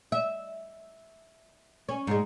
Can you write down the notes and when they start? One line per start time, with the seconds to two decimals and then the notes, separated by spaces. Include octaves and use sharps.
0.12 E5
1.89 C#4
2.07 G#2 G#3